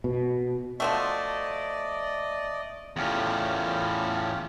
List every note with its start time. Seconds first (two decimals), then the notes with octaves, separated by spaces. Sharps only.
0.04 B2
0.80 F3 F#3 A3 D5 D#5
2.96 E2 A2 C#4 F4 G4